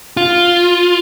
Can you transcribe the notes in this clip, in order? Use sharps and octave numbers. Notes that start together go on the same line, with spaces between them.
F4